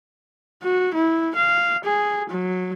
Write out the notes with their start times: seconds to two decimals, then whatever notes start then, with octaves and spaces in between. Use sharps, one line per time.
0.63 F#4
0.94 E4
1.36 F5
1.84 G#4
2.29 F#3